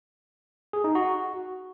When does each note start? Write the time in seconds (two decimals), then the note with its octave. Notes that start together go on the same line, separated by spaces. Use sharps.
0.73 G#4
0.84 D#4
0.95 F#4